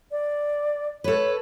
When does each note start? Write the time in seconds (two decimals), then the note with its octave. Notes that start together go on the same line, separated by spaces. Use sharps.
0.11 D5
1.04 A4 B4 C#5